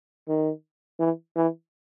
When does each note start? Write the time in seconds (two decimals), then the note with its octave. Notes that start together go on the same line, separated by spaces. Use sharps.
0.28 D#3
1.00 E3
1.36 E3